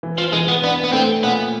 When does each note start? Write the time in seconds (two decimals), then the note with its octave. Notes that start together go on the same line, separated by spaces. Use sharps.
0.03 E3
0.18 F3
0.32 E3 G#3
0.48 B3
0.63 B3 D4
0.84 B3
0.92 A3 C4
1.23 A#2 B3